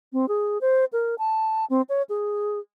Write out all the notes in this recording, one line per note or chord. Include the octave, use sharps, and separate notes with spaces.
C4
G#4
C5
A#4
A5
C4
C#5
G#4